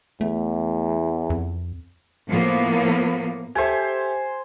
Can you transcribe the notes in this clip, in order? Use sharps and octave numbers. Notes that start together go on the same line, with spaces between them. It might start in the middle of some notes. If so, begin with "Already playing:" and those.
E2 A3
F2
A2 F3 A#3 B3
G4 A4 C5 E5 G#5